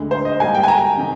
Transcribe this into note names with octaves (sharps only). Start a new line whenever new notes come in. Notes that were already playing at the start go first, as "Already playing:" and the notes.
Already playing: D2 D3 G#3
C5
D#5
G#2 G3 A#3 G#5
G5
G#5
A#5
C3 D#3